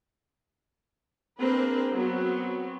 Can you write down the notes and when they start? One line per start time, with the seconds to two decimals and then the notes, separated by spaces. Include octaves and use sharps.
1.41 A#3 C4 D4 G#4 A#4 B4
1.93 F#3 B3 C4